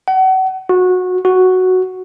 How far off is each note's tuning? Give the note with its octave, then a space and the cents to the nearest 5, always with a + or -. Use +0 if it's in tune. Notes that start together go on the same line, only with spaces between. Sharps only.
F#5 +35
F#4 -20
F#4 +0